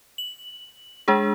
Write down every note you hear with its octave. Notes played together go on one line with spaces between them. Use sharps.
F#7
G#3 D4 G#4